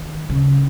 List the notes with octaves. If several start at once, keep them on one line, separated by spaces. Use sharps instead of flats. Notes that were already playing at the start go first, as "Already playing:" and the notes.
Already playing: D#3
C#3